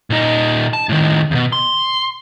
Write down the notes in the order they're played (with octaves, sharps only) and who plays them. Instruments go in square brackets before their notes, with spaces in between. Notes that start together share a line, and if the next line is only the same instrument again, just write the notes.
[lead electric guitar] A#2 D#4
A5
A2 D#3
E2 B2
C6